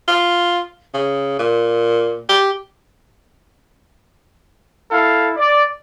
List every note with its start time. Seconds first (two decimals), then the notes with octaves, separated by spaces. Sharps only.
0.08 F4
0.94 C#3
1.39 A#2
2.29 G4
4.91 E4 A4 F5
5.37 D5